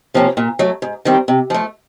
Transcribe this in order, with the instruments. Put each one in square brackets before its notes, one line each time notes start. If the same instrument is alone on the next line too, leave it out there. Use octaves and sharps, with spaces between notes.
[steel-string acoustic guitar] C3 F3 A#3 C#4
A#2
F#3 A3
G#2
D#3 G3 C4
C3
F3 A3